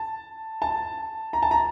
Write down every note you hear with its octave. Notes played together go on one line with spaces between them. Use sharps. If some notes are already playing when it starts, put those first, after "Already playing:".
Already playing: A5
A5
A#5
A5
A#5